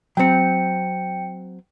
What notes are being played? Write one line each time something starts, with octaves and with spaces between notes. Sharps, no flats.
F#3 C4 G5 C#7